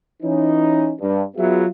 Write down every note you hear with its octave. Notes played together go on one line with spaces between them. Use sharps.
E3 C#4 D#4
G2
F#3 B3 F4 F#4 G#4 E5